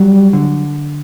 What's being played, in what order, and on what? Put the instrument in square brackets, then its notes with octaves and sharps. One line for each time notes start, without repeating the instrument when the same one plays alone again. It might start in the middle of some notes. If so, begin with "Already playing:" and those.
Already playing: [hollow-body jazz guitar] F#3 [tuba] G3
[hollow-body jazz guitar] D3